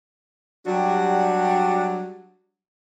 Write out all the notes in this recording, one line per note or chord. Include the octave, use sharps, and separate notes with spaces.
F#3 G3 D4 F#4 G4